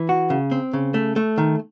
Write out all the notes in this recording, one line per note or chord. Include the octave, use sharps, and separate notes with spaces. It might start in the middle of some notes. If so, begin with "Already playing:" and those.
Already playing: E3
F#4
C#3
C4
C#3
A3
A3
D#3